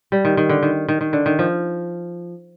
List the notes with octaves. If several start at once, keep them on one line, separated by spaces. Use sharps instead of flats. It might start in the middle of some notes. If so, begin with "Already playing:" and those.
G3
D#3
D#3
D3
D#3
D#3
D#3
D3
D#3
F3